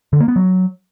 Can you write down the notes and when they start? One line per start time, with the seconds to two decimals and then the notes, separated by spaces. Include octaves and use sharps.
0.13 D3
0.20 A#3
0.28 B3
0.36 F#3